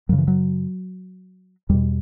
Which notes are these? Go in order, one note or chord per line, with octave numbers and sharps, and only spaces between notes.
F#2 C#3 F#3
E3
F#3
E2 B2 G3